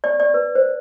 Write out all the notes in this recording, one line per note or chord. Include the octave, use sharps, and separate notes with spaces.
D5
D5
B4
C5